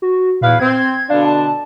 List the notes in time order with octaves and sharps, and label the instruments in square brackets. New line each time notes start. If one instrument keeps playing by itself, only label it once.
[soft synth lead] F#4
[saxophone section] E2 B4 F5 [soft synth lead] A#2
[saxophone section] C4 [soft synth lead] G#6
[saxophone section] B2 D3 D4 [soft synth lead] F5
[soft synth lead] A5